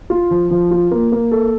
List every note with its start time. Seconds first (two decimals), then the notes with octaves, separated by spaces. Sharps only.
0.10 F4
0.31 F3
0.51 F3
0.71 F4
0.91 A#3
1.12 A#3
1.31 A4